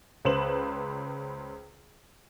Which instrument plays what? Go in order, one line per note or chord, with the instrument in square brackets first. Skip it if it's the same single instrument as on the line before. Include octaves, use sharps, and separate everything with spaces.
[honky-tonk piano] C#2 B4 C5 E7 F#7